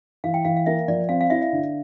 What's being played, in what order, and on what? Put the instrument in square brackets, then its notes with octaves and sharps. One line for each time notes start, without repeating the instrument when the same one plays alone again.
[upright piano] E3 [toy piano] F5
[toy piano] G5
[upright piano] E3 [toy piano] F5
[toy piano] F5
[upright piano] A#3 [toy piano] E5
[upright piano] F3 [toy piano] D5
[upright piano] C4 [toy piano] F5
[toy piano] F5
[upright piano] E4 [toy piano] E5
[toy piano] E5
[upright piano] D3